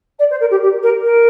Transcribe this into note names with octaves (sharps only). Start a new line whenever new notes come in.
D5
C5
A#4
G4
G4
A#4
A#4